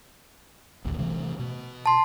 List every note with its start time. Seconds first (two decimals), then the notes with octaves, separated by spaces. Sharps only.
0.85 D#1 A1 D2
0.98 C3 E3 A3
1.39 B2
1.86 A5 C6